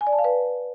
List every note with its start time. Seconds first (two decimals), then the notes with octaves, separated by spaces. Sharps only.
0.01 G#5
0.07 D5
0.13 A5
0.19 F5
0.24 B4